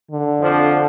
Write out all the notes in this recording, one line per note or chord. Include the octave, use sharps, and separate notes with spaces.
D3
F2 F3 D4 F4 C5